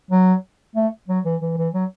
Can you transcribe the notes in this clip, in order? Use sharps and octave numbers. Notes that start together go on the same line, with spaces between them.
F#3
A3
F#3
E3
E3
E3
F#3